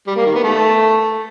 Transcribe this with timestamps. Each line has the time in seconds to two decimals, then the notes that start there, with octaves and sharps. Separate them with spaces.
0.07 G3
0.16 A#3
0.25 D#3
0.34 B3
0.44 A3